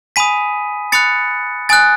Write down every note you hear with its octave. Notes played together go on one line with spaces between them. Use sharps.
G#5 B5 D#6 B6 D#7
B5 D#6 F#6 A6 C#7
G#5 D#6 F#6 A6